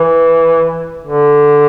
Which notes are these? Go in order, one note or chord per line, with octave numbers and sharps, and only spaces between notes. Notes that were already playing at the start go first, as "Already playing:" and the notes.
Already playing: E3
D3